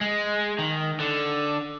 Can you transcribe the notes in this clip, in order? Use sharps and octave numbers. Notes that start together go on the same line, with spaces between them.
G#3
D#3
D3